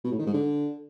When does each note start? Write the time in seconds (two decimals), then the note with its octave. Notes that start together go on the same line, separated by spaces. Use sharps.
0.04 B2
0.12 A2
0.19 D#3
0.26 G#2
0.34 D3